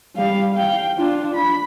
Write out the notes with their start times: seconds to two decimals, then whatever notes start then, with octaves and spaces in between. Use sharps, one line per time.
0.16 G3 F5
0.54 F5 G5
0.97 D4 F4
1.35 B5